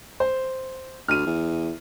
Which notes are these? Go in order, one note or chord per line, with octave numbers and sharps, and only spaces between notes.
C5
D2 F6 D#7
E2